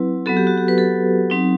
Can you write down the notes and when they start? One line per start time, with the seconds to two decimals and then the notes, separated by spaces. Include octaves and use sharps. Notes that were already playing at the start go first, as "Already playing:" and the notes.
Already playing: F#3 C4 E4 B4
0.26 F#3 B3 F#4 A4
0.37 G4
0.47 F#4
0.58 G4
0.68 B4
0.78 A4
1.30 F#3 C4 D#4